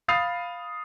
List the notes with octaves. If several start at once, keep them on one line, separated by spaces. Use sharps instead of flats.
F5 B5 D#6 A6 C7 F7